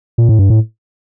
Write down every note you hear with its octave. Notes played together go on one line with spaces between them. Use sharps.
A#2
A2
G2
A2